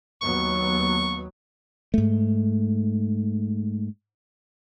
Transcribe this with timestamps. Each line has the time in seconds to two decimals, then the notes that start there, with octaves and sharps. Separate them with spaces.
0.22 D#2 F#3 B3 C#6
1.94 G#2 A3